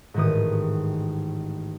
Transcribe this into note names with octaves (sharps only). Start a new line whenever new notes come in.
A1 G#2 D#3 D#6